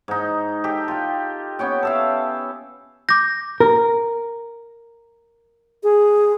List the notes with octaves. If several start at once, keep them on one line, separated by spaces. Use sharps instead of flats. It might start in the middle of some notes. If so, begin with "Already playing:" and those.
G#2 D#4
G4 A4
F4 G5
B3 C#4 C#5 G5
A4 E5 F5
D6 G6 A#6
A#4
G#4